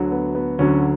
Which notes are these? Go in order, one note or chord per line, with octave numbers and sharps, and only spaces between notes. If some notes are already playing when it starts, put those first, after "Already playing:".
Already playing: D2 D3 F#3
B3
B3
D2 D3 F#3 C#4